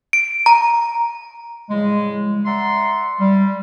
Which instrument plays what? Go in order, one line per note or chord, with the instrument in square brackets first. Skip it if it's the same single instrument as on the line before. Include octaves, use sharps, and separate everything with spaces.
[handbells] D7
A#5
[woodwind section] A2 C#3 F3 G3 G#3
D5 E5 F#5 A#5 C6
G3